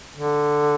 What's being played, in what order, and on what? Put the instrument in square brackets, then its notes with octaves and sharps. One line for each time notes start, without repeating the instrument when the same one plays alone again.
[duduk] D3